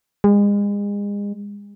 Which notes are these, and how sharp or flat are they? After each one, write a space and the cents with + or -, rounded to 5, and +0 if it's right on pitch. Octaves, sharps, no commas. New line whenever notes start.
G#3 -35